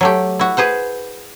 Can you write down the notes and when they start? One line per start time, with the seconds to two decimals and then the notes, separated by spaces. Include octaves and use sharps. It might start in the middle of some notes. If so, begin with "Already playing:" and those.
0.01 F#3 A3 G4
0.39 E4 F#4
0.57 G#4 B4 C5 F#5